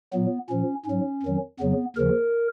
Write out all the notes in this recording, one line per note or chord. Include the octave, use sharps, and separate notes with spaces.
A#2 F#3 B3
A#2 F3 C#4
G#2 F#3 C#4
F2 D#3 F#3
F2 C#3 F#3 B3
D#2 C#3 F3 A#4